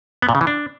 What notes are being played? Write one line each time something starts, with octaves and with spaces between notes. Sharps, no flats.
B3
A#2
C#3
E3
D4